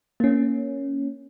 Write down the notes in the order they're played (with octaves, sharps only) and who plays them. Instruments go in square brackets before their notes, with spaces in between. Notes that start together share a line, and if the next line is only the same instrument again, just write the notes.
[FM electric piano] A#3 C#4